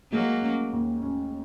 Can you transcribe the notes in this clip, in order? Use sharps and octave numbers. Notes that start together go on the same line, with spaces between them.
F#3 G#3 A#3
C#4
D#2
C#4